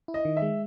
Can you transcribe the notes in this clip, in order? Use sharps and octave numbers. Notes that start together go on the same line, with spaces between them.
E4
D#5
D#3
E5
G#3